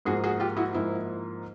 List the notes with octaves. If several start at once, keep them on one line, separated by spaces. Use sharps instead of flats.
G#2 F3 A#3 F#4 G#4
F#4 G#4
F4 G4
E4 F#4
G#2 F3 A#3 E4